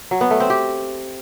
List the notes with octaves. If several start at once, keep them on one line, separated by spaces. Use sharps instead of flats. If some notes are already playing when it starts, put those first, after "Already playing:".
F#3
B3
A3
C4
G4